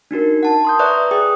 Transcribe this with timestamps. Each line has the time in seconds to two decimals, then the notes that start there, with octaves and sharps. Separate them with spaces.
0.11 D4 D#4 F#4 A#4
0.43 F#5 A5
0.65 C6 D#6 G6
0.79 B4 D5 E5 A#5 C#6 F#6
1.11 G#4 G5 D#6